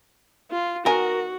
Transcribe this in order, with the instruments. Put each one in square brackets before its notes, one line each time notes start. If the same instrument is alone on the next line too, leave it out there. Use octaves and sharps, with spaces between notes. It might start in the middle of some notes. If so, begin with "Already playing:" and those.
[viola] F4
[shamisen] D#3 B3 G#5 [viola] F#4 [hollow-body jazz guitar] A#4